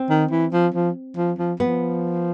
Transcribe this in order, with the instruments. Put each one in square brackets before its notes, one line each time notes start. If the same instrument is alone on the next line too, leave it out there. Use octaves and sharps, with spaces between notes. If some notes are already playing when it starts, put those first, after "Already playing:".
Already playing: [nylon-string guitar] C4
[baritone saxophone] D#3
E3
F3
F3
F3
F3
[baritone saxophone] F3 [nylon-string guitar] B3